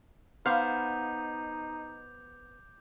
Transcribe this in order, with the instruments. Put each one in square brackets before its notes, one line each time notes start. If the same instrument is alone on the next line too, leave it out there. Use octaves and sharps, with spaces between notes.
[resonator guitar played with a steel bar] B3 C5 [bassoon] D#4 [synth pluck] F5 [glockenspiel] D6 G6 F7